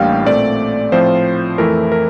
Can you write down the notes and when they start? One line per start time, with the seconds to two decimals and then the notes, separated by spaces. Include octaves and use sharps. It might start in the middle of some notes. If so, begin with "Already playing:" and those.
Already playing: A1 A2 G3 A#3 D4 F5 G5
0.26 A#2 A3 C4 D5
0.92 A2 F3 C4 F4 C5
1.58 F2 E3 A3 E4 A#4
1.92 A#4